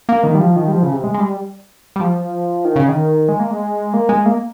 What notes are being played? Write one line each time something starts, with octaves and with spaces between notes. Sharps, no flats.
A#3
D#3
G3
F3
D#3
G3
F3
C#3
C3
G#3
G#3
G3
G3
F3
D#3
C#3
D#3
G#3
A#3
G#3
A#3
G#3
A#3